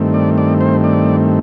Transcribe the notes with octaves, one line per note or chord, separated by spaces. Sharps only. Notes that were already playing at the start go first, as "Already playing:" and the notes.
Already playing: G2 D#3 A3 C4
D5
D5
C5
D5